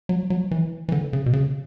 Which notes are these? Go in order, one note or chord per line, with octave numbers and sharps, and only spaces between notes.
F#3
F#3
E3
E3
D3
C#3
B2
C#3